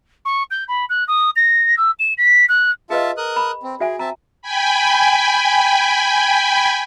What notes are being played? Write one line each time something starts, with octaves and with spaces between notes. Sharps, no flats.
C#6
G6
B5
F#6
D#6
A#6
E6
E7
B6
F#6
F4 G#4 B4 D#5 E5 A5
A#4 D#6 F#6
B5
C4
F#4 G#4 E5 G#5
C4 E5 A5 A#5
G5 G#5 B5